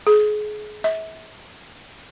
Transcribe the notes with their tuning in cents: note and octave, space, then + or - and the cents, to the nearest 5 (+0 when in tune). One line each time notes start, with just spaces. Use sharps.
G#4 +30
E5 -35